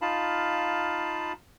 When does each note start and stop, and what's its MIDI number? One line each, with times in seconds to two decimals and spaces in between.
0.02 1.33 63
0.02 1.33 65
0.02 1.33 77
0.02 1.33 81
0.02 1.33 83